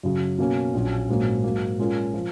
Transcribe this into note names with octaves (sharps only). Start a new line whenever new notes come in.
F#2 C#3 F#3
B2 A#3 C#4
A#1 A#2 F#3 C#4
A#1 G#2 F#3 A#3 C#4
G#2 F#3 A#3
A#2 G#3 C#4 F4 A#4
F3